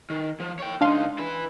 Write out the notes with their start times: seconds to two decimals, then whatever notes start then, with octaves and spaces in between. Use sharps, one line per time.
0.10 D#3
0.40 F3
0.59 C#5 G5
0.81 C#2 D4 D#4 F5 C6
1.18 E4 B4